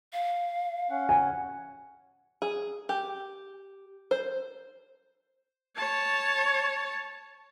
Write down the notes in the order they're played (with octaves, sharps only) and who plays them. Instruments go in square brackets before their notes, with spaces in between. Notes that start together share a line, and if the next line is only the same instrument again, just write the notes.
[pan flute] F5
[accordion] C#4 F#5
[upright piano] G#5
[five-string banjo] G#4
G4
C5
[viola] C#5 A5